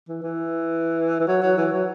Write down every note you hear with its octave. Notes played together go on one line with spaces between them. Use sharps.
E3
E3
E3
F#3
F#3
E3
F#3